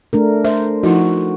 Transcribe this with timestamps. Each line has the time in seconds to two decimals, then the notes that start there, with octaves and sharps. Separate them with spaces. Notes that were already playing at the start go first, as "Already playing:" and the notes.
0.13 A3 D4 A#4
0.45 C5 E5
0.83 F3 D#4 E4 F#4